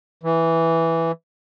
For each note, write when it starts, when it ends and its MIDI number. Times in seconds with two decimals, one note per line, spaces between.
0.23 1.12 52